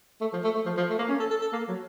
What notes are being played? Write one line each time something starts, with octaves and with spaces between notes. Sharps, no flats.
A3
F3
A3
A3
F3
F3
A3
A#3
C#4
A4
A4
A4
A#3
F#3